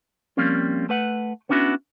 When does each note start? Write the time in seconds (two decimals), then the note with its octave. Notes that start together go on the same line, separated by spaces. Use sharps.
0.37 F3 G3 A#3 C4 C#4
0.89 A3 B4 F#5
1.49 B3 C#4 D4 E4 F#4